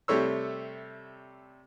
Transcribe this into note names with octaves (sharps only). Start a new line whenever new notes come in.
C3 G3 A3 C#5 E6